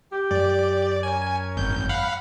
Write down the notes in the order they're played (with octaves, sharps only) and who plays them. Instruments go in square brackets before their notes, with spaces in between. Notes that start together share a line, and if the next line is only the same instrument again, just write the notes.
[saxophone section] G4
[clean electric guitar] F#2 [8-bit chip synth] D5
[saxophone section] C#4 A#4 C#5 [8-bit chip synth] G#5
[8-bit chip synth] G#1 G6
F5 F#5 B5